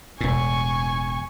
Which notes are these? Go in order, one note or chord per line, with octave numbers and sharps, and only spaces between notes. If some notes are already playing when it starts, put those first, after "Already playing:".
E1 A2 G#5 C#6